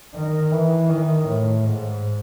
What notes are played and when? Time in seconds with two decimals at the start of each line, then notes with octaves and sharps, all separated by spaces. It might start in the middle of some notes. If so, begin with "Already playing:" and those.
0.15 D#3
0.52 E3
0.89 D#3
1.28 A2
1.64 G#2